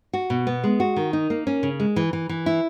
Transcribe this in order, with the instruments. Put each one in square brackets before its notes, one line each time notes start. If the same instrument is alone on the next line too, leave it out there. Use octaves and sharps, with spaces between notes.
[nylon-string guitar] F#4
B2
B3
G#3
F#4
D#3
D#4
A#3
C#4
C#3
G#3
E3
E3
E3
E4